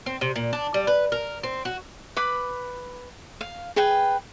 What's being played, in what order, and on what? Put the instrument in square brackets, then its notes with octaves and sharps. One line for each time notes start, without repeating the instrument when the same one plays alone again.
[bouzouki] C4
C3
A#2
D4
G3
B4
A#4
C4
F#4
[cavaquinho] B4 B5 D6
F5
G#4 B4 G5